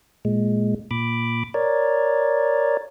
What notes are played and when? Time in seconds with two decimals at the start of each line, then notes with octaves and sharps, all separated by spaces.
0.25 A#2 G#3
0.91 A#2 B5 D6
1.54 A#4 C#5 D5